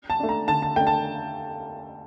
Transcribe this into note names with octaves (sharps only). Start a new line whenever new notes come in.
A5
A3 D4
A#5
D3 A5
A5
A3 D4 G5
A5